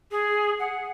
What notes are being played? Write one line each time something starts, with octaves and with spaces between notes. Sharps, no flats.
G#4
F#5